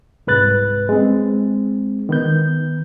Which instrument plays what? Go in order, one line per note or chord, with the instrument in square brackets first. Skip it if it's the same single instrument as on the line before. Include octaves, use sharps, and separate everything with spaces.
[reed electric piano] C2 G#2 B4 F#6 A6
G#3 C4
D#3 B3 G6